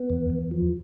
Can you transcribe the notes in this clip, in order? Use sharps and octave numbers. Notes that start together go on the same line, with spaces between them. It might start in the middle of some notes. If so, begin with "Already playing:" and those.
Already playing: B3
E2
E2
F3